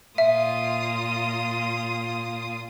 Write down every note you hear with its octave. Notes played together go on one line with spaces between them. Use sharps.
A#2 F4 E5 D#6